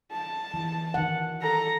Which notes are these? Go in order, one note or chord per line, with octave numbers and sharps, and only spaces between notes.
A5
E3
D#3 F#5
A4 A#5